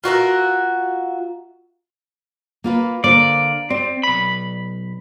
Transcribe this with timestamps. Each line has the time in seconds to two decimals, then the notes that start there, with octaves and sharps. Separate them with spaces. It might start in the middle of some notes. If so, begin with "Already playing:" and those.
0.04 F4 F#4 A#4 E5
2.64 A#3 F4 B4
3.04 D3 A#3 C5 D5
3.70 C4 D5
4.03 B1 B5